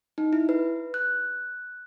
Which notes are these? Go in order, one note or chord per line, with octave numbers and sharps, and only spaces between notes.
D#4
E4
B4
F#6